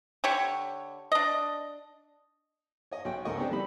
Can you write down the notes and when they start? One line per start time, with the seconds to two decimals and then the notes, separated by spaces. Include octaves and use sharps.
0.24 D3 G4 C#5 C#6
1.12 D4 D#5
2.91 C#5 D#5
3.05 B1 F#4 C#5 G5
3.25 C#2 G#2 A4 A#4 D#5 C#6
3.37 B3 C4 D4 G4 C5
3.51 G3 D#4 A4 B5